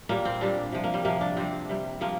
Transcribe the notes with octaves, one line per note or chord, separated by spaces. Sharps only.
A#2 G3 A#3
C4
A#2 G3 D4
C3 F3
A#3
G3
C3 F3 A#3
D4
C3 G3 C4
C3 G3
C3 F3 A#3